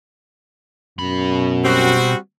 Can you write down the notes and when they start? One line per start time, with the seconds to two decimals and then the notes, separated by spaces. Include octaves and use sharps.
0.99 F#2 B2 B5
1.64 G3 C4 F#4